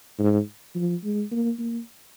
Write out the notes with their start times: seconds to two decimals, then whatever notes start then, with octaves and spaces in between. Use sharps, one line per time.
0.19 G#2
0.75 F3
1.04 G#3
1.32 A#3
1.59 A#3